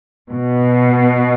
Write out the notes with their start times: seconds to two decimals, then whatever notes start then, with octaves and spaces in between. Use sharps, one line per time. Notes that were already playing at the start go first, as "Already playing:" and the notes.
0.32 B2